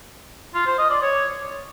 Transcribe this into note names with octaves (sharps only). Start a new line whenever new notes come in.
F4
C5
D#5
D5
C#5